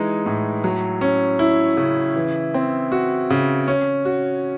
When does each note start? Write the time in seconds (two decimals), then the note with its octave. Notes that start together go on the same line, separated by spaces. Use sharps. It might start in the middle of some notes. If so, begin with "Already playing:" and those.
Already playing: E3 G#3 D#4
0.26 A2
0.64 F#3
1.01 C#4
1.39 E4
1.77 C#3
2.16 E3
2.54 C4
2.92 F#4
3.30 C#3
3.68 C#4
4.05 F#4